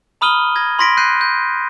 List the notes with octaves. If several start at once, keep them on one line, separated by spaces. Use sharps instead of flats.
A#5 B5 D#6 F6 D#7 G7
D#6 G#6 A#6
B5 C6 G#6 A#6 B6 D7
F#6 G6 C7 D#7
G6